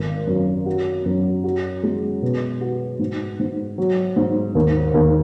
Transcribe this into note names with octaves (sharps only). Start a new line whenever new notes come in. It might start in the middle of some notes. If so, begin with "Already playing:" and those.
Already playing: G#1
F#2
F#4
F#2
F#4
G#3
B2
F#4
G#2
G#2
F#3
G#2
D#2
D#2